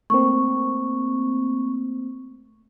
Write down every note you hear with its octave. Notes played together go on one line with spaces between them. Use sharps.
A3 A#3 C4 C#6